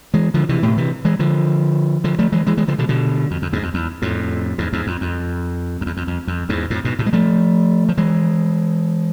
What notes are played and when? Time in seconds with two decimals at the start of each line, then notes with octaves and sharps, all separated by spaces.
0.14 E3 G#3
0.34 D3 F3
0.49 C3 E3
0.63 A2 C3
0.77 C3 E3
1.05 E3 G#3
1.19 D3 F3
2.04 D3 F3
2.19 F3 A3
2.32 E3 G#3
2.47 E3 G#3
2.57 E3 G#3
2.68 D3 F3
2.78 B2 D3
2.89 B2 D3
3.31 F2
3.42 F2
3.52 E2 G#2
3.63 F2
3.74 E2
4.02 F2 A2
4.58 E2 G#2
4.73 E2 G#2
4.87 F2
5.01 F2
5.81 F2
5.86 E2
5.97 F2
6.07 F2
6.27 F2
6.49 E2 G#2
6.70 F2 A2
6.85 G#2 B2
6.99 A2 C3
7.06 G#3
7.13 F3 A3
7.89 F3
7.97 E3 G#3